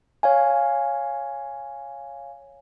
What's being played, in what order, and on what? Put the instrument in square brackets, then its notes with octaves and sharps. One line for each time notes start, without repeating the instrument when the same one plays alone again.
[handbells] C#5 F5 G#5